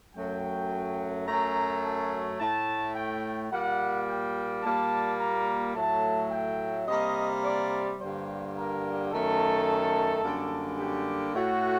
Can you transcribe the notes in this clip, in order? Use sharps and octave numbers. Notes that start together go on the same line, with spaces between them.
F#2 F#3 A3 G5
F#2 F#3 A3 A#5
A5
A2 A3 A5
G5
A#2 G3 A#3 F#5
G5
A#2 G3 A#3 A5
A#5
A2 F#3 A3 A5
G5
C3 G3 A#3 D#5
D5
G2 D3 G3 A#3 C5
A#4
F#2 D#3 A3 A4
F#2 D3 G3 A#3
G4
A2 A3 F#4